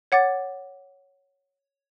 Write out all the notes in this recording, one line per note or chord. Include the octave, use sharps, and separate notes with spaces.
C#5 F#5 D6 A6